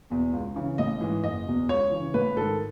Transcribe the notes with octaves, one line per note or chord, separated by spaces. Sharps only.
E2 B2
C#2
C#3 E3
A1 D#5
G#2 E3
F#1 D#5
E2 B2
C#2 C#5
C#3 E3
A1 B4
G#2 D#3 A4